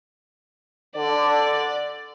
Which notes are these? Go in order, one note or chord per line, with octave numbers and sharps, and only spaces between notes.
D3 D5